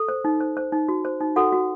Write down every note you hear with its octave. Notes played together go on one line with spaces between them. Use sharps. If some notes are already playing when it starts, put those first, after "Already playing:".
Already playing: A4
C5
D#4
C5
C5
D#4
F#4
C5
D#4
F#4 A4 F#5
F#4